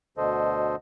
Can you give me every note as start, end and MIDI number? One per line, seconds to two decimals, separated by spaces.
0.17 0.76 38
0.17 0.76 47
0.17 0.76 50
0.17 0.76 69
0.17 0.76 72
0.17 0.76 75